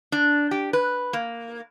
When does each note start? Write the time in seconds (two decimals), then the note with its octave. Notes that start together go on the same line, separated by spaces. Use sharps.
0.12 D4
0.51 G4
0.73 B4
1.13 A#3